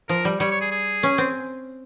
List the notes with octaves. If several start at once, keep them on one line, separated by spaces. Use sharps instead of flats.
F3 A#4
G3
G3 C#5
C#5
G#4
G#4
C#4
C4